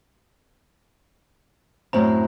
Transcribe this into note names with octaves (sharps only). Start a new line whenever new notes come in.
F#2 A2 A3 C4 A#5